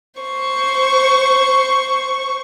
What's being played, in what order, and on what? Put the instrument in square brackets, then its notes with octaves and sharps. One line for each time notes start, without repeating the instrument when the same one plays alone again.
[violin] C5 C#6